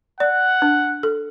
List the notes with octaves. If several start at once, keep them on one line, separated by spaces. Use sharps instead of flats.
D5 F#5
D4
A4